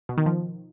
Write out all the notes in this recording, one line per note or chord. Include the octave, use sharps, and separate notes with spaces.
B2
D#3
F3